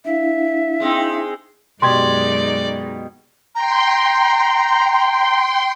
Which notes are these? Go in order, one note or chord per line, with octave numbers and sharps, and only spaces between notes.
D4 E4 E5 F5
G#3 C4 D#4
F#2 B2 G#3 D#4 G4 D5 C6 G#6
G5 A#5 C6